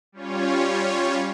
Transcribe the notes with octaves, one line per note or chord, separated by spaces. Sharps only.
G3 C#4 F4 C#5